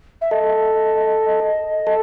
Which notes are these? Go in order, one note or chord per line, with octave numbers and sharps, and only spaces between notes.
E5
A4 D#5
A4